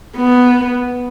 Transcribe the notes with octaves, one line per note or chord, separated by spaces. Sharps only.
B3